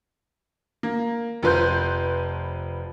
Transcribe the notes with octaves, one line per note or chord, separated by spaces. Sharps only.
A#3
F1 F3 B4 C6 G6